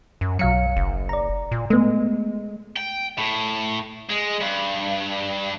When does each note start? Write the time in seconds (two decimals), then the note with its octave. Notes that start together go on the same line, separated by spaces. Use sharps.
0.21 F#2
0.39 B1 F#3 F5 C#7
0.77 F#1
1.09 D5 A#5
1.51 A#2
1.70 G#3 A3 B3
2.76 G5
3.18 A2
4.10 G#3
4.41 G2